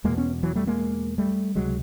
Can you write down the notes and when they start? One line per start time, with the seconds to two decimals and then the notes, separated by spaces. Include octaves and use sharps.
0.04 E2 B2 G#3 A#3
0.18 B3 C#4
0.43 E3 F#3
0.55 G3 A3
0.67 G#3 A#3
1.18 G3 A3
1.55 C#2 C3 F#3 G#3